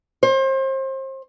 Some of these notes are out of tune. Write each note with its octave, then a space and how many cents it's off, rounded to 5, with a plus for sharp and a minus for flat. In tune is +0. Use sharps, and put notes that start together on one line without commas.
C5 +35